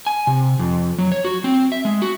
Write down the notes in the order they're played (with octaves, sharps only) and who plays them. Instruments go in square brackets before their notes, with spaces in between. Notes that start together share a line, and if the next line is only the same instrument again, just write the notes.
[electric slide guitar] G#5
C3
F2
F#3
C#5
F#4
C4
E5
G#3
F#4